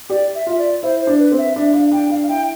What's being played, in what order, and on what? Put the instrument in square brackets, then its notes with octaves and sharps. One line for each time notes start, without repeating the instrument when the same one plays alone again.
[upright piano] G4 [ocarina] D5
[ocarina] E5
[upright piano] F4 [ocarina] E5
[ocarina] D5
[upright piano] E4 [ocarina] C5
[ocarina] C5
[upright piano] D4
[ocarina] B4
[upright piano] C4
[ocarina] E5
[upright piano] D4 [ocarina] E5
[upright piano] D4 [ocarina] F5
[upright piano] D4 [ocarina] G5
[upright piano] D4 [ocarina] F5
[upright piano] E4 [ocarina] G5